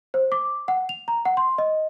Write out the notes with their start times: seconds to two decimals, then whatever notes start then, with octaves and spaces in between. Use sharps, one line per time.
0.14 C5
0.32 D6
0.68 F#5
0.89 F7
1.08 A#5
1.25 F#5
1.37 C6
1.58 D#5